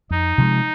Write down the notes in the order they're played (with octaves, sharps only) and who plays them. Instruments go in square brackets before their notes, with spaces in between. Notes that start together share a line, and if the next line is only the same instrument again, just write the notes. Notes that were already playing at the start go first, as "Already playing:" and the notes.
[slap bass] F2 [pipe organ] D#4
[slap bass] C3 F3 G#3